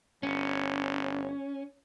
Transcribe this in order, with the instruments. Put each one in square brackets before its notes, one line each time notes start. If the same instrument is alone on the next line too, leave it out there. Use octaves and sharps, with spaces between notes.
[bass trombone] G1 [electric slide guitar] C#4